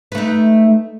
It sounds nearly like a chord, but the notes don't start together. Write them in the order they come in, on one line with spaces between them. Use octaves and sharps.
B4 A3 D#4